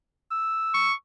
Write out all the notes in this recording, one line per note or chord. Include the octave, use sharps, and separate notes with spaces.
E6
C#6